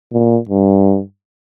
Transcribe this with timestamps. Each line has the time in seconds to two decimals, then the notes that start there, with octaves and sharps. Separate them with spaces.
0.13 A#2
0.49 G2